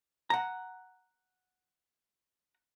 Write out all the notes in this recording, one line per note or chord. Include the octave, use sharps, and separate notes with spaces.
F#5 A#5